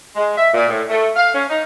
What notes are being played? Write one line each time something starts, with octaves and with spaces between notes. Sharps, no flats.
G#3
E5
A#2
A2
A3
F5
C#4
D#4